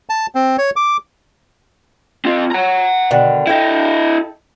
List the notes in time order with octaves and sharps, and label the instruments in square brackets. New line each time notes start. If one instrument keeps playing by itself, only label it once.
[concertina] A5
C4
C#5
D6
[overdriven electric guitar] C4 F4
F#5 A#5
[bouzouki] B2 D3 D#3
[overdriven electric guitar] E4 D#5 [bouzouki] A4 G5